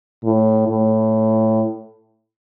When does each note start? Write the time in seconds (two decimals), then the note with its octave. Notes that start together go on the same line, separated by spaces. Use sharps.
0.24 A2
0.68 A2